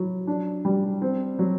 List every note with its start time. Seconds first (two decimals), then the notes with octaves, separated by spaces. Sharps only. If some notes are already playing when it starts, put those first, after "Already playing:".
Already playing: F#3 E4
0.27 D4
0.65 G3
1.02 C4
1.39 F#3